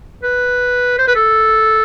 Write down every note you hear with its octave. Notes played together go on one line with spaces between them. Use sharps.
B4
C5
B4
A4